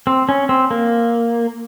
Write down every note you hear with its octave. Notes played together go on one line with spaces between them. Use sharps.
C4
C#4
C4
A#3